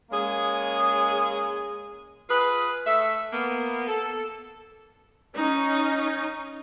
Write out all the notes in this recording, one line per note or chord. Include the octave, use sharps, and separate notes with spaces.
G#3 A#3 C#4 G#4
F4 G#4 B4
A3 A4 E5
A#3 B3
A4
C#4 D#4